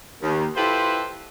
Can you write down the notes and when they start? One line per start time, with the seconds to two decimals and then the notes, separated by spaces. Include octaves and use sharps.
0.21 D#2
0.55 E4 F4 G4 A4 B4 C5